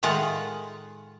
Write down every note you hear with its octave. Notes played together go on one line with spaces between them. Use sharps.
A2 D#3 G#3 F4 F#5